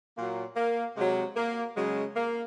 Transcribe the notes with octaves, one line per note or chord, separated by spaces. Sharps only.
A#2 F#3 A#3
A#3
C3 F#3 G#3
A#3
C#3 F#3 G#3
A#3